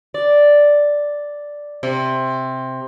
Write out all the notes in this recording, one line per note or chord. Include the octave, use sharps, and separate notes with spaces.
D5
C3